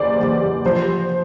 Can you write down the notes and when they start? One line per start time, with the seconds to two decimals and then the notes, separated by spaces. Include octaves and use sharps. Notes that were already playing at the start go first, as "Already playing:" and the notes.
Already playing: F#1 E2 C3 C5 D5
0.20 F#1 E2 C3
0.65 C3 F3 C5